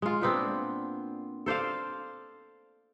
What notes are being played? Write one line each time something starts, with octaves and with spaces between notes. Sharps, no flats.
G#3 F4
A#2 B3 C4 D4
A4 C5 D5 F5